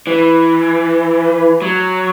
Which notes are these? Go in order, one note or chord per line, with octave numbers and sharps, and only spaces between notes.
E3
F#3